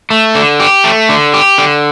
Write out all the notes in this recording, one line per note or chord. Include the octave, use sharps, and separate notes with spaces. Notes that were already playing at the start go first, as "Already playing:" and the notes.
A3
D3
G4
A3
D3
G4
D3